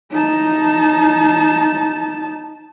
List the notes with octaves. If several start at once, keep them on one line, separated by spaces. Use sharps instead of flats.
D#4 A5